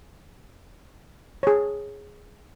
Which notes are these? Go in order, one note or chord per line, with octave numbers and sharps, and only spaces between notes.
G#4 C#5